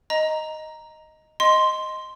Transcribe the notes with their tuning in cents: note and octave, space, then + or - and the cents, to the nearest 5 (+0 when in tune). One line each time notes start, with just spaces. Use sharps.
D#5 +0 A#5 +0
D#5 +0 C6 +0